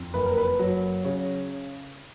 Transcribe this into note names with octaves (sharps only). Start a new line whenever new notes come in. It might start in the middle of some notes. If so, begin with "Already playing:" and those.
Already playing: F2
F#1 B4
A#4
B4
F#3
C#3 C#5